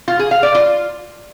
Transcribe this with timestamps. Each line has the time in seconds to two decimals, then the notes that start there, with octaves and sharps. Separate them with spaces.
0.08 F4
0.19 G#4
0.31 F5
0.43 D5
0.55 F4